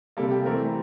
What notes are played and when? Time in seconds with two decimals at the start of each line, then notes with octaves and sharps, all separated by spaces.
0.17 C3 G3 A#3 A4
0.31 G4
0.45 E3 A3 C4 A#4